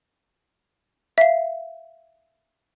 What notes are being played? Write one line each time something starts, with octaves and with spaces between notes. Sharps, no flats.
E5 F5